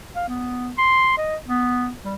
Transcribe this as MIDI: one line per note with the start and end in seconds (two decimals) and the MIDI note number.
0.15 0.28 77
0.28 0.70 59
0.78 1.15 84
1.18 1.36 75
1.47 1.92 59
2.04 2.16 55